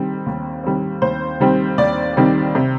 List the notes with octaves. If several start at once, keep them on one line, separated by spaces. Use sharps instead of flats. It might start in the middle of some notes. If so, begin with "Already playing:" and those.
Already playing: D#3 G3 C4
D#2
D#3 G3 C4
D#2 C5
D#3 G3 C4
D#2 D5
D#3 G3 C4
C3